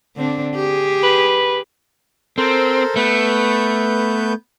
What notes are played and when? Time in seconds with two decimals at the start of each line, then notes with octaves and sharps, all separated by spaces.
0.16 D3 C4 D4
0.55 G4 G#4
1.03 B4
2.38 C4 A4 A#4 C5
2.96 A3 B3 B4 G6